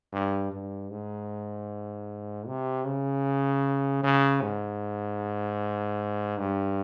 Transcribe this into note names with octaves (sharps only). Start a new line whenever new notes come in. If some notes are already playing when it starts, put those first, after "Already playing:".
G2
G2
G#2
C3
C#3
C#3
G#2
G2